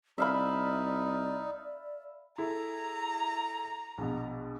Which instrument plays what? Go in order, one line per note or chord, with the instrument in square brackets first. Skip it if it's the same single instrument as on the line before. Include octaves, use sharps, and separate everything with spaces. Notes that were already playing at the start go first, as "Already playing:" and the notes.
[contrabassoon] C2 [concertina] D#4 [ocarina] D5 [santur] E5 F5 B5
[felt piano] E4 G#4 A4 [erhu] A#5
[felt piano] A#1 B2